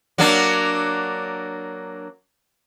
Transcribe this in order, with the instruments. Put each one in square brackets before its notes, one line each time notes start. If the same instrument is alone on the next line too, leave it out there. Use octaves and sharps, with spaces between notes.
[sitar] F#3 A#3 D4